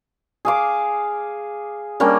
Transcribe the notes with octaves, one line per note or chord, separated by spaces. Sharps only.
G#4 F5 D6
G3 A#3 C#4 D4